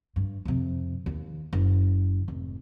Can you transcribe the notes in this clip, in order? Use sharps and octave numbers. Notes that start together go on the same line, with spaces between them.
G2
F2 C3
D#2
F#1
F1 G#2